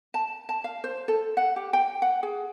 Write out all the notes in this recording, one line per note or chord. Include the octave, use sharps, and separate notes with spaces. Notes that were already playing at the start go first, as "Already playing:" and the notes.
A5
A5
F5
C5
A4
F#5
G4
G5
F#5
G#4